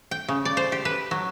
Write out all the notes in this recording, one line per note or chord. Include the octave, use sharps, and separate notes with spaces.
G5
C#3
D5
C5
G4
B4
F#3